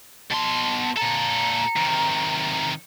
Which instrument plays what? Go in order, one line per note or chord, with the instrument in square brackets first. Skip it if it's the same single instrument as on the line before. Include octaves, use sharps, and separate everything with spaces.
[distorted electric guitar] B2 C6 [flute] A5
[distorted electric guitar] A#2 A4 [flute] A#5
[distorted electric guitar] C3 D#3